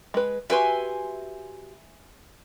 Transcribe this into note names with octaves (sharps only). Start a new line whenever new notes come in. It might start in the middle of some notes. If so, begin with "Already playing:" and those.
G#3 B4
F#4 G4 B4 E5 G#5 C6